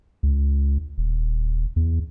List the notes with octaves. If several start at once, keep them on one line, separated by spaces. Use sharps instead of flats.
C#2
D#1
E2